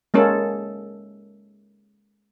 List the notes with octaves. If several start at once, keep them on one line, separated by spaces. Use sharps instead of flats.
G#3 A#3 C#4 A4